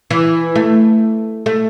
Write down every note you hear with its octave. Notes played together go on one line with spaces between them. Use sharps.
E3
A3
A3